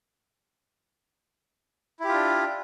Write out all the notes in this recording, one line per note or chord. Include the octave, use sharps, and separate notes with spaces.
D4 E4 F4 G4